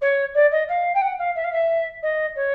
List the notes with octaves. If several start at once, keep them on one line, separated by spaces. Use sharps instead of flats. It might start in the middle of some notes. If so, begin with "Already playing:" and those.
C#5
D5
D#5
F5
G5
F#5
F5
E5
F5
E5
D#5
C#5